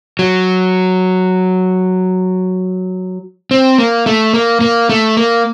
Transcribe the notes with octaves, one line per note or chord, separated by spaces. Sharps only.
F#3
C4
A#3
A3
A#3
A#3
A3
A#3